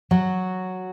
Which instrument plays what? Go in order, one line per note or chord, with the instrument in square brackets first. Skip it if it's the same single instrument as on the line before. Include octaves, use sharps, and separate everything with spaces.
[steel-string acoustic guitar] F#3 F#4